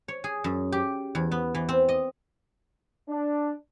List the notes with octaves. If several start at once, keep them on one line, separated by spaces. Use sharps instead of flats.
C#5
G#4
F#2
G4
E2
B3
E3
C4
D#5
D4